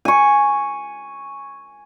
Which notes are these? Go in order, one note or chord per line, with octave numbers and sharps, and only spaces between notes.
G#5 C#6